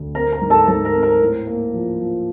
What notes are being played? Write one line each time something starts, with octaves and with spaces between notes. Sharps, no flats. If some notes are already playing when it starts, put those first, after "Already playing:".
Already playing: D2
C4 A#4 A#5
A#4 A#5
G#2
A4 A5
G#2 A4 A5
A#4 A#5
C4
A#4 A#5
A2
A#3
F3
F3